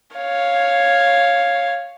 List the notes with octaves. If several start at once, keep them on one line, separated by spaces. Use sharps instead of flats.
C#5 F5